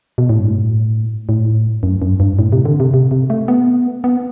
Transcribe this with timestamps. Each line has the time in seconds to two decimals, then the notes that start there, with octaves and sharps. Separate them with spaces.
0.18 B2
0.29 A2
0.39 G2
0.50 A2
1.29 A2
1.83 F#2
2.02 F#2
2.20 G2
2.39 A2
2.52 C3
2.65 D3
2.80 C3
2.94 C3
3.11 C3
3.30 A3
3.48 B3
4.04 B3